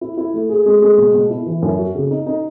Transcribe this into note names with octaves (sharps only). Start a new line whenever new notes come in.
E4
E4
A3
G#4
G#3
G#3
B2
B2
E4
E3
F#2
F#4
C#3
D#4
D#4